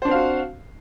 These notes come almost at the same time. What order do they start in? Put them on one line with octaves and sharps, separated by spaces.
C5 D4 C4 F5 F#4